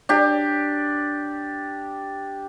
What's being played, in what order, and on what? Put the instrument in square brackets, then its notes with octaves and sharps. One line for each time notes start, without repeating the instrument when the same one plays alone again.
[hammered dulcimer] D4 G4